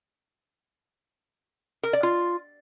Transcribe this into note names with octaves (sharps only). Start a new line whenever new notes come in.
A#4
D5
F4